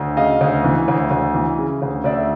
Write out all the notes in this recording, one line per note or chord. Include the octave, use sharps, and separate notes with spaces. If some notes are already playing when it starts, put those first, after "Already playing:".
Already playing: D2
C#3 D#5 F5
D2
E3
D2
D2
E3
C#3
D2
D2 D5 E5